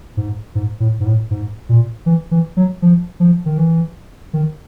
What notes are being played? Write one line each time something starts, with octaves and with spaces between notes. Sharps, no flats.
G#2
G#2
A2
G#2
A2
G#2
A#2
E3
E3
F#3
F3
F3
D#3
E3
D#3